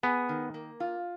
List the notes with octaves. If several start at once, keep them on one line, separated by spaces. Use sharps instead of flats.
B3 G#4
D#3
A#3
F4